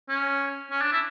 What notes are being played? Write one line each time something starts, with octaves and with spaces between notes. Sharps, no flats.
C#4
C#4
D4
E4